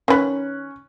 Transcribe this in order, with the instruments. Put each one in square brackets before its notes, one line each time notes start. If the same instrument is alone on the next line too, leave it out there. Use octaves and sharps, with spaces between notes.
[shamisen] D#3 B4 [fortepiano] C#4 F#6